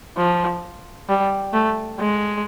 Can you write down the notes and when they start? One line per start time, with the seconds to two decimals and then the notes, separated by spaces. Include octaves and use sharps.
0.17 F3
1.09 G3
1.53 A3
1.98 G#3